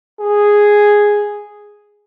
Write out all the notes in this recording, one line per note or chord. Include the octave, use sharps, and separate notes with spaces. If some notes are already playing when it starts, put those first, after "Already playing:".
G#4